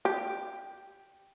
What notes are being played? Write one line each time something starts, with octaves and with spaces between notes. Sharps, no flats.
G4